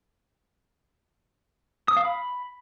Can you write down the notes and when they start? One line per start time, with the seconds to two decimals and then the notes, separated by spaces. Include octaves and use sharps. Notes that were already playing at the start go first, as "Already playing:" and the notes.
1.88 D#6
1.97 F5
2.05 B5